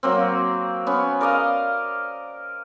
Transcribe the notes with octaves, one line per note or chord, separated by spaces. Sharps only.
F#3 A#3 C4
B3 C#4
A#4 D5 D#5 F5